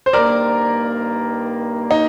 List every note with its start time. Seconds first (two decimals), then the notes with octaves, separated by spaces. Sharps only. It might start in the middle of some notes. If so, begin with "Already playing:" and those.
0.06 C5
0.13 G2 D#3 A#3 A#4 D5
1.91 D#4